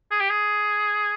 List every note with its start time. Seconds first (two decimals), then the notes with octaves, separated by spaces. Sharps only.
0.11 G#4
0.20 G4
0.30 G#4